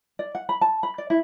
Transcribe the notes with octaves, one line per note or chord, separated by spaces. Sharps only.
D5
F#5
B5
A5
B5
D5
E4